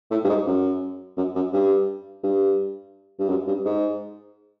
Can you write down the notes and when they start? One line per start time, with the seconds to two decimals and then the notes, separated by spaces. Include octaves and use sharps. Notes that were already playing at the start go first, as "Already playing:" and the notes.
0.11 A2
0.25 G2
0.29 G#2
0.47 F#2
1.17 F#2
1.35 F#2
1.53 G2
2.24 G2
3.19 G2
3.29 F#2
3.47 G2
3.65 G#2